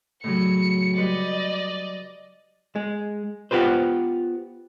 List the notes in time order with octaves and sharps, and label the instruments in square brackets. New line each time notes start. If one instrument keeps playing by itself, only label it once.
[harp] A2 C#3 F#3 [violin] C#7
[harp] G3 B4 [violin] D5 D#5
[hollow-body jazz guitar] G#3
B3 F4 G4 B4 C5